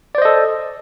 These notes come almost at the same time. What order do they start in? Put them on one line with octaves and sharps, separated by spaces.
D5 C5 D#5 A4